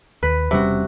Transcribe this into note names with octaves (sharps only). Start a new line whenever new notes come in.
D#2 B4
E1 C3 G3 C#4 F#4